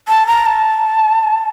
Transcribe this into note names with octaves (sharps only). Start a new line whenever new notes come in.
A5
A#5
A5